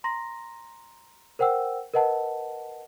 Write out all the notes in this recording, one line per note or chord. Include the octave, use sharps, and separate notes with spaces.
A#5 C6 A#6
A#4 C5 F#5 G5 E6
A#4 B4 D#5 F#5 A5